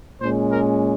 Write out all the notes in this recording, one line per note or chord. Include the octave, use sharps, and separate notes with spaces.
A#2 G#3 C#4 C5
A#4